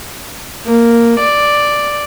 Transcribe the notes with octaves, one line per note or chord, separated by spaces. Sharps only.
A#3
D5